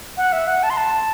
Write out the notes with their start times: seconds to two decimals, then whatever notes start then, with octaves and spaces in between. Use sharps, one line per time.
0.17 F#5
0.32 E5
0.47 F#5
0.63 A5
0.70 C6
0.77 A5